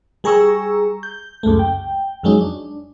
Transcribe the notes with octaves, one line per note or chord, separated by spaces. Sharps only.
G3 G#4 A#5 C#6 E6
G6
C#2 F#2 G#3 A3
G5
F2 F#3 G#3 C#4 D#4
D4